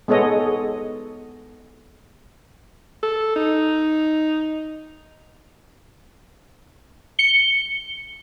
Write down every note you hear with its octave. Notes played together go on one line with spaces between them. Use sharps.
G#3 B3 A4 C#5 D#5
A4
D#4
C#7 G7